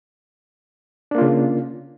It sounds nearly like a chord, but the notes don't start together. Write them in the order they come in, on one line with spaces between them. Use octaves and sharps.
D4 A#3 F4 C#3